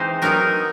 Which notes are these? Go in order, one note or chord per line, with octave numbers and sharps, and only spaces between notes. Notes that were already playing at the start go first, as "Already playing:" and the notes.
Already playing: E3 G#3 C4 D#4 C5
F#3 B3 D#4 A#4